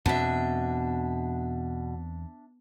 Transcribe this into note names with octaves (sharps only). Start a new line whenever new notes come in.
E2 B2 C4 D4 E5